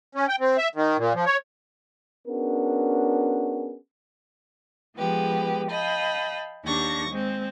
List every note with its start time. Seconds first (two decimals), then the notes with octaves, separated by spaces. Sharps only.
0.15 C#4
0.29 G5
0.40 C4
0.58 E5
0.75 D#3
0.97 A#2
1.14 F3
1.26 C#5
2.28 B3 C#4 D4 F#4 G#4 A#4
4.95 F3 G#3 B3 G4 G#4 B4
5.70 D#5 F5 G5 A5 B5
6.64 D#2 D4 G4 C#6 A#6
7.09 G#3 C4